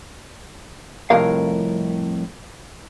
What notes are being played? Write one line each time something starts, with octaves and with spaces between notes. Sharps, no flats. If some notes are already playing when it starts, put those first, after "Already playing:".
C2 F2 A2 A#4 F5